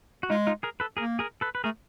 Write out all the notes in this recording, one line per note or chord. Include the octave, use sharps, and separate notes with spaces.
F#4
G#3 D#4 F4
D#4 F4
G#4 A#4
A4 B4
A#3 G#4 A#4
G#4 A#4
A4 B4
B4
A3 G#4 A#4